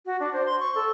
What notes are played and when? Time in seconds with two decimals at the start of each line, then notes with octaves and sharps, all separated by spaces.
0.06 F#4
0.20 D4
0.33 C5
0.46 C6
0.60 C#6
0.75 A4